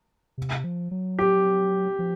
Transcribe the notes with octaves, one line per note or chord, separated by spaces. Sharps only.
C3
F3
F#3
G4
F3